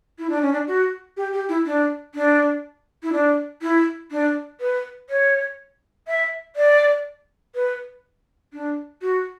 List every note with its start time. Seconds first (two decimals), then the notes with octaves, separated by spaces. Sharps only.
0.19 E4
0.30 D4
0.42 C#4
0.53 D4
0.67 F#4
1.17 G4
1.33 G4
1.49 E4
1.66 D4
2.15 D4
3.03 E4
3.12 D4
3.62 E4
4.11 D4
4.60 B4
5.10 C#5
6.08 E5
6.56 D5
7.55 B4
8.53 D4
9.02 F#4